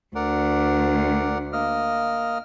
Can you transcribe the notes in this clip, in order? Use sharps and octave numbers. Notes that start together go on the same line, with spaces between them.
D2 A#4 D5 F#5
A#3 D#5 F6